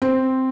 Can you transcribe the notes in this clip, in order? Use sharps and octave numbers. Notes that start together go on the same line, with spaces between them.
C4